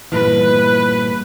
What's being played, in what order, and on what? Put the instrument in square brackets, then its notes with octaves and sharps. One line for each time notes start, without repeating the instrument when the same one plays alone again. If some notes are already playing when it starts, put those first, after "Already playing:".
[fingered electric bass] G2 A#2 E3 [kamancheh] B4